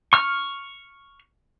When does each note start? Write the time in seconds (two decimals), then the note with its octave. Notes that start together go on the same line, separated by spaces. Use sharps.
0.13 C#6 F6